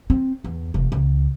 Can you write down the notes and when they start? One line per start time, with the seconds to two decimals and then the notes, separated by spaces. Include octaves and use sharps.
0.10 C4
0.44 E2
0.74 F1
0.92 C#2